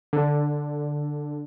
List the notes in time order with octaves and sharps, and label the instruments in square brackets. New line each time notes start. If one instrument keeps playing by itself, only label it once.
[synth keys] D3